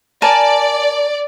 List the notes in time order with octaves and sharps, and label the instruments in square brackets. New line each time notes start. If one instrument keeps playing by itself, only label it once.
[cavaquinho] A#4 G#5 A5 [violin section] D5